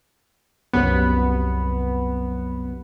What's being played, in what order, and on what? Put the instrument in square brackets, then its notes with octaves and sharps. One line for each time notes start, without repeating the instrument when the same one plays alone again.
[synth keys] C2 F#2 B3